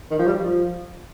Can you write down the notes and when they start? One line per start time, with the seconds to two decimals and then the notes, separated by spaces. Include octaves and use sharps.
0.11 D#3
0.19 F3
0.27 G3
0.43 F3